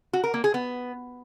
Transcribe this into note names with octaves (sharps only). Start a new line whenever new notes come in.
F#4
A#4
A#3
G#4
B3